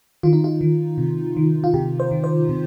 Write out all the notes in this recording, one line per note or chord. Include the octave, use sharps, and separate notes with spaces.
D#3 F4
D#4
F4
D#3
C3
D#3
F4
C3 G4
C5
D#3
C5
C3